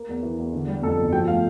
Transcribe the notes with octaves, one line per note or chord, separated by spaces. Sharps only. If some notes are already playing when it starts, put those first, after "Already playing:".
Already playing: A#3
E2
E3
E2
D3
G3
F2 A4
G1
F3 G5
A3 F5